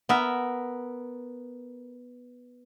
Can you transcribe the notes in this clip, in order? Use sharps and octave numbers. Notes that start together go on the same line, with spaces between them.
B3 A#4 E5